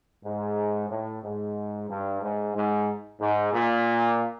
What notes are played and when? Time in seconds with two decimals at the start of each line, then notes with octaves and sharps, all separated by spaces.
0.24 G#2
0.90 A2
1.23 G#2
1.89 G2
2.22 G#2
2.55 G#2
3.20 G#2
3.53 A#2